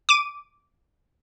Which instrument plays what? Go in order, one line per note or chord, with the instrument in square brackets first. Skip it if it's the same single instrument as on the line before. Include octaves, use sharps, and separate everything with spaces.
[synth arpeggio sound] D6 D#7